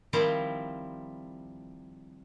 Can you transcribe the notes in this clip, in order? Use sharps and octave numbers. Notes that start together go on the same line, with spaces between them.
D#3 F3 G3 C4 E4